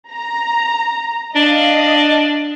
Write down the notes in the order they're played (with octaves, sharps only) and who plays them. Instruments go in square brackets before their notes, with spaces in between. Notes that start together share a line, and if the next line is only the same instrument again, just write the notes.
[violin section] A#5
[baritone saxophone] D4 [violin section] D#5 F5